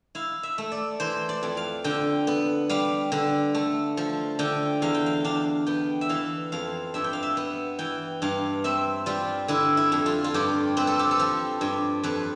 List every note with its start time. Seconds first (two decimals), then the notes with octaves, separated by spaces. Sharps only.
0.15 E4 F5
0.43 E5
0.58 A3
0.72 D5
1.00 E3 C5
1.29 D5
1.43 F2
1.57 F5
1.84 D3 G5
2.27 B3
2.69 G3 F5
3.12 D3
3.54 A3
3.97 F3
4.39 D3 G5
4.82 E2 F5
4.94 G5
5.06 F5
5.24 D4 F5
5.67 B3 G5
6.01 E5
6.09 E3 F5
6.52 F2 F5
6.94 G2 E5
7.04 G5
7.13 F5
7.23 E5
7.37 B3
7.79 E3 G5
8.22 G2 F5
8.64 C4 E5
9.06 G3 F4
9.48 D3 E4
9.77 E4
9.92 F2
10.06 F4
10.24 F4
10.34 G2 G4
10.77 C4 B4
10.87 A4
10.99 G4
11.11 A4
11.19 F3
11.61 G2
12.03 F2 B4